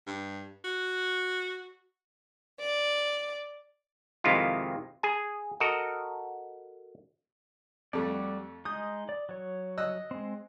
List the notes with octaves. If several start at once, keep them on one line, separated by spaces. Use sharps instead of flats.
G2
F#4
D5
F2 C3 D#3 G#3 E4 F4
G#4 G#5
F#4 A4 A#4 D#5
F2 G3 A3 F#4 D5
G#3 D#4 D#6 G6
D5
F#3 C#5
D#5 E6 F#6
G#3 C4